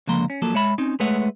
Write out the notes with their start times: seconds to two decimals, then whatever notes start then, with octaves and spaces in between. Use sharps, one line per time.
0.08 C#2 D3 F3 A#3 A#5 C6
0.30 C#4
0.42 F3 F#3 A#3 A4
0.54 G#3 C#5 E5 B5
0.78 C4 C#4 D#4
1.00 G#3 A3 B4 C#5 E5 F#5